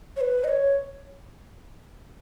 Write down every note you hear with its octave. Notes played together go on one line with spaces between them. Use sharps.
C#5
B4
D#5
C#5